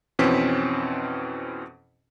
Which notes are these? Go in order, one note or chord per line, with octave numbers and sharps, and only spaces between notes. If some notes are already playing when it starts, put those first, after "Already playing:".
F2 B2 E3 C4 C#4 B6